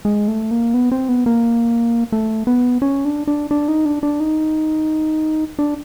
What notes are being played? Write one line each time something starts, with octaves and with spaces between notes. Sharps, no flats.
G#3
A3
A#3
B3
C4
B3
A#3
A3
B3
C#4
D4
D4
D4
D#4
D4
D4
D#4
D4